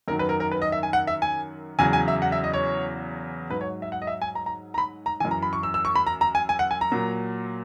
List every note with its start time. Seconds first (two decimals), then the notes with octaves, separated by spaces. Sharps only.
0.08 F#2 D#3 F#3 A#4
0.19 B4
0.29 A#4
0.40 A#4
0.52 B4
0.62 D#5
0.72 E5
0.83 G#5
0.93 F#5
1.07 E5
1.22 G#5
1.79 E2 C#3 F#3 G#5
1.93 G#5
2.08 E5
2.22 F#5
2.32 E5
2.44 D#5
2.54 C#5
3.50 G#2 F#3 B4
3.61 C#5
3.82 E5
3.92 F#5
4.02 D#5
4.07 E5
4.22 G#5
4.35 A#5
4.46 A#5
4.74 A#5
4.78 B5
5.06 A#5
5.20 E3 G#5
5.25 F#2
5.31 A#5
5.43 B5
5.53 C#6
5.63 E6
5.74 E6
5.85 C#6
5.96 B5
6.07 A#5
6.21 A#5
6.35 G#5
6.49 G#5
6.59 F#5
6.71 G#5
6.81 A#5
6.92 A#2 F#3